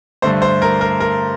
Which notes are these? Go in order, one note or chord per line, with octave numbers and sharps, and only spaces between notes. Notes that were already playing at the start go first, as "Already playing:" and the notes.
G2 D3 A3 C5
C5
A#4
A#4
A#4